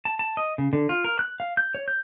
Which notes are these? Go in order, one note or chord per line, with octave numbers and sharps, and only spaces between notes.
A5
A5
D#5
C#3
D3
F4
A#4
F#6
F5
G6
C#5
G6